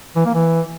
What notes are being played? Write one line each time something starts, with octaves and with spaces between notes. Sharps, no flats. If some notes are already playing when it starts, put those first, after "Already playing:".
E3
A#3
E3